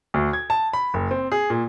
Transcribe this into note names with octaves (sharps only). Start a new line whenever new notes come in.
D2
G#6
A5
B5
F#1
C4
G#4
A#2